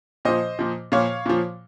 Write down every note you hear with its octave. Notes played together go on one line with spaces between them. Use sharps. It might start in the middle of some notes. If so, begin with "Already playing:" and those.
A#2 F3 C5 D#5
A#2 F3
A#2 F3 C#5 F5
A#2 F3